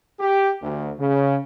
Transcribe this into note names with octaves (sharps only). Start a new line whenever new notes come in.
G4
D2
C#3